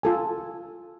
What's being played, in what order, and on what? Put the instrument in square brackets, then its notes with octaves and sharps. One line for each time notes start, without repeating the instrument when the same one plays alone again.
[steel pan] F4 A4 G#5